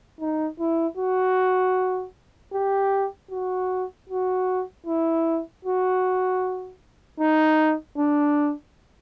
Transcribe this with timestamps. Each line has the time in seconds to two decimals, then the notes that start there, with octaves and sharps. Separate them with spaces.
0.21 D#4
0.60 E4
0.97 F#4
2.53 G4
3.31 F#4
4.09 F#4
4.86 E4
5.65 F#4
7.20 D#4
7.98 D4